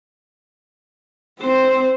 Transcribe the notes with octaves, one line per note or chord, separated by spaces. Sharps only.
C4 C5